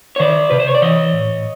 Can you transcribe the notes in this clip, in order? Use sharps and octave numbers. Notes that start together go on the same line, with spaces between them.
C#5
D#3 C5 D5
C3 B4
C5
C#5
D5
E3 C#5 D#5
A2